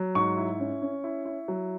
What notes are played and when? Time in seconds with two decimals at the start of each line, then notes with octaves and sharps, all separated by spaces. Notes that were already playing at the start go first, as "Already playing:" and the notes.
Already playing: F#3
0.15 G#2 C#6
0.37 E4
0.60 C#4
0.82 C#4
1.04 E4
1.25 E4
1.48 F#3